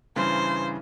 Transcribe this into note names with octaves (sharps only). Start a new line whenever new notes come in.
G2 C#3 E3 C5